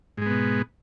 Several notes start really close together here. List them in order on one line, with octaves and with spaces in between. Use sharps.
G#2 G#3 B3 B2